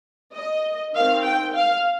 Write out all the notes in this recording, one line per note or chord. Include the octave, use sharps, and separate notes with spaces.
D#5
D#3 C4 F5
G5
F5